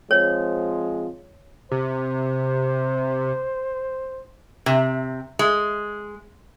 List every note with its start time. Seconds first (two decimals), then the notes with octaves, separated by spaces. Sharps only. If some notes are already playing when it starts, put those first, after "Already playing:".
0.11 F3 G#3 C4 C#5
1.71 C3 C5
4.66 C3
5.39 G#3